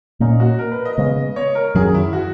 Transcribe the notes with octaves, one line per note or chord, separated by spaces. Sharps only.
A#2 A#3 C#4 D#4
F#4
A#4
B4
D#5
C#3 G#3 B3
C#5
A#4
F#2 D#3 F#3 C#4 G#4
E4
F#4